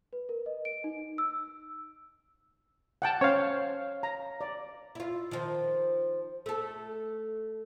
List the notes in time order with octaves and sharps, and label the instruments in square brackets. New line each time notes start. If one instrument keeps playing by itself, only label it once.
[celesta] B4
A#4
D#5
D7
D#4
E6
[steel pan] F#5 G5 A5
[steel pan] C#4 C5 [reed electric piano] C#5 F5
[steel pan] A#5
D5
[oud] E4 F4
D#3 F3
A3 A4